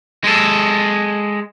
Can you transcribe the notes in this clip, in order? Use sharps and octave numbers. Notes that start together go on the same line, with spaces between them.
G#3 A4